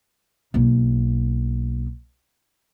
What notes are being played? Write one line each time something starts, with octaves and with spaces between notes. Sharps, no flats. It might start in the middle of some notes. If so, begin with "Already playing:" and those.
B1 A#3